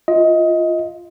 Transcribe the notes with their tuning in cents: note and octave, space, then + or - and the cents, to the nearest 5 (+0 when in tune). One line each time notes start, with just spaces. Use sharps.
F4 -5 D#5 +20